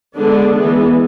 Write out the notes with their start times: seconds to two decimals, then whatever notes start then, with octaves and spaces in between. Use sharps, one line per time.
0.16 D3 G#3 B3 D4
0.54 E3 G#3 B3